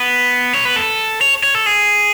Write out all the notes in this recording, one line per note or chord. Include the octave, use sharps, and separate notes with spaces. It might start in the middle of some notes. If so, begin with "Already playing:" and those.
Already playing: B3
C#5
B4
A4
C#5
C#5
A4
G#4